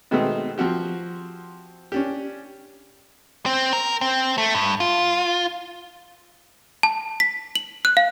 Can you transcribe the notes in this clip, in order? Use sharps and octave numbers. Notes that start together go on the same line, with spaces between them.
B2 D#3 G#3 A3 B3 C4
F3 C4 F#4 G4
C#4 D4 G4
C4
A#4
C4
A3
G2
F4
A5
B6
F#7
F#6
F5